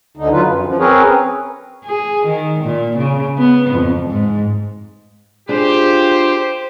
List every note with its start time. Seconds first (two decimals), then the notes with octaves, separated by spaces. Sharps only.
0.17 D2 D3 D#4
0.32 D3 F#3 F4 B4
0.46 F#2
0.66 F3
0.79 C4 C#4 G#4 A#4 B4 C#5
1.85 G#4
2.26 D#3
2.64 A#2
2.98 C#3
3.38 B3
3.74 F2
4.09 G#2
5.49 D4 F4 G4 G#4 C5